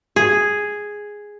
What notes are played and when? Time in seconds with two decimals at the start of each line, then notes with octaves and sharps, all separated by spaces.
0.16 G#4